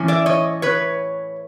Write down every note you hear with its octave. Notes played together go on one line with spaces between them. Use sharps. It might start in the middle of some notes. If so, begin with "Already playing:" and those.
Already playing: A2 E3 C#4
D5 E5
C#5 D#5
B4 C#5